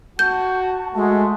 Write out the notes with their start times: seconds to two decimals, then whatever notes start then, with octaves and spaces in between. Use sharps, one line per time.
0.19 F#4 A5 G6
0.95 G#3 A3 F#4